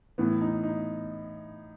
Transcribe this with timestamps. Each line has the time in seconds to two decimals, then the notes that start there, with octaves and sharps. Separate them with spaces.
0.18 A2 E3 B3
0.41 D#4
0.63 D#4